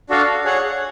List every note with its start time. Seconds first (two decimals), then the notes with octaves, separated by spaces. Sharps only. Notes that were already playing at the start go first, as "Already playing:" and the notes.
0.09 D4 F#4 A4 F5
0.45 G#4 C#5 F#5